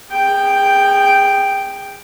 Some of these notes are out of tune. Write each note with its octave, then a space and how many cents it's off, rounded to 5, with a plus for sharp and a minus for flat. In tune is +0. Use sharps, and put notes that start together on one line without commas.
G#4 -30 G5 +0